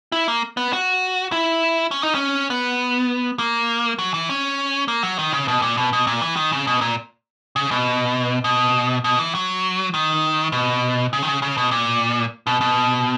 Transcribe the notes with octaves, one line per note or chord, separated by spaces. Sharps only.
E4
A#3
B3
F#4
E4
C#4
D#4
C#4
B3
A#3
F#3
E3
C#4
A#3
F#3
D#3
C#3
B2
A#2
B2
B2
A#2
E3
D#3
C#3
B2
A#2
C#3
B2
B2
B2
E3
F#3
D#3
B2
C#3
D#3
C#3
C#3
B2
A#2
B2
B2